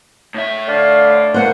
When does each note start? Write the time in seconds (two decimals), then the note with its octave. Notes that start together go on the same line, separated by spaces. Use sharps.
0.35 A2 E5
0.68 D3 D5 F5
1.34 B2 A#3 C5 F#5